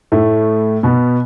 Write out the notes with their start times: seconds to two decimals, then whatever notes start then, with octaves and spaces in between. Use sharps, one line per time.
0.12 A2 A3
0.83 B2 B3